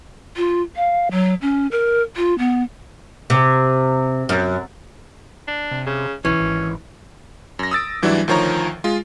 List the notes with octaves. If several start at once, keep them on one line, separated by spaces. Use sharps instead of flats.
F4
F5
F#3
C#4
A#4
F4
B3
C3
F#2
D4
C3
C#3
B1 E3 C#4
G#1
F#2 A#6
D#6 E6 A6 D7
G#2 E3 F#3 G3 D4 E4
D2 D#3 F3 C#5 A#5
G#3 F4